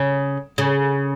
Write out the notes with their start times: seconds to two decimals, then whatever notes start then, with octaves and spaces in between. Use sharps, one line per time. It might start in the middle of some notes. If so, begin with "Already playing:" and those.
Already playing: C#3
0.58 C#3